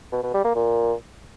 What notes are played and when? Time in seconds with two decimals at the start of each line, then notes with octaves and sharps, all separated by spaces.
0.12 B2
0.23 B2
0.34 G3
0.45 A#3
0.55 A#2